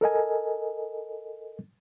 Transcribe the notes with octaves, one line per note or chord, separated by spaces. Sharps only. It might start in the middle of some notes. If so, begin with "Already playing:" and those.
A4 A#4 D#5 G#5